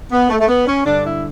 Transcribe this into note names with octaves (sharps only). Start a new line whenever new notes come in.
B3
A3
A3
B3
C#4
G2 D3 D4
E4